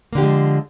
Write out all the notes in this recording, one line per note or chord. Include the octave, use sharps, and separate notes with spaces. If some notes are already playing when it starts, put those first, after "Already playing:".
D3 F3 G#3 A#3 G4